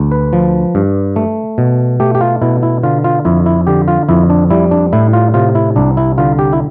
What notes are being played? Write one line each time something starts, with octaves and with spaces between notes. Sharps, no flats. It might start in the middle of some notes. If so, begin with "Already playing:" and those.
Already playing: D2
B4
F3
G2
A3
B2
A3 G4
G4
F4
B2 E4
E4
D3 F4
F4
F2 E4
E4
D3 G4
F4
F2 E4
D4
G3 E4
D4
A2 E4
F4
C3 F4
E4
C2 D4
E4
D3 F4
G4
E4